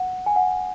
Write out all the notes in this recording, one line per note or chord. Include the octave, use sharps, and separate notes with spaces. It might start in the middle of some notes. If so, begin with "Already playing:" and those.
Already playing: F#5
G#5
F#5